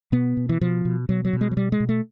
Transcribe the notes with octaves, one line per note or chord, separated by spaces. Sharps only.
B2 B3
B2
E3
B2 F3
B2
B2 F#3
F#3
B2
G#3
F#3
B2 G3
G#3
B2
A3